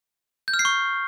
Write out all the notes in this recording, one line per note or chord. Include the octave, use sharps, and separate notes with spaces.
G6
F6
C7
C#6